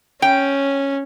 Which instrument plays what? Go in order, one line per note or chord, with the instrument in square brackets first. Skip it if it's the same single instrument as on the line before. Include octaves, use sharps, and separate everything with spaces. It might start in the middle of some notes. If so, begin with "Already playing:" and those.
[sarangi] C#4 [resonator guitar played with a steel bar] G5